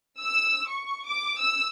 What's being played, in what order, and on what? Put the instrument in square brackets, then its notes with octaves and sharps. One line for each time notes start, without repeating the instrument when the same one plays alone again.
[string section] E6
C#6
D6
E6